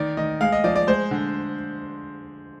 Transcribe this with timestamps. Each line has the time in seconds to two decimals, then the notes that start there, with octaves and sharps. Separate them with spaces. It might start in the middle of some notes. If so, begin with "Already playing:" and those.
Already playing: D#3 D5
0.17 D#3 D#5
0.41 G#3 F5
0.52 D#5
0.64 F3 D5
0.76 D5
0.87 G#3 C5
1.11 D3